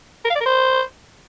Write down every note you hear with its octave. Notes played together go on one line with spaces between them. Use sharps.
A#4
F5
D5
A#4
C5